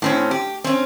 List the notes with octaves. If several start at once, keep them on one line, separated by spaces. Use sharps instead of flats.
A2 C4 C#4
G4
C4 C#4